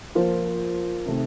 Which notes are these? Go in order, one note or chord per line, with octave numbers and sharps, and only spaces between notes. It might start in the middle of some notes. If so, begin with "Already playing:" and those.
F3 A#3 F4 C5
C3 D#3 A3 C4